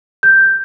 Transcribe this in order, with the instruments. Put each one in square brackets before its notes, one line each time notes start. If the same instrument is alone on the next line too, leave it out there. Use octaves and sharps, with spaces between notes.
[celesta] G6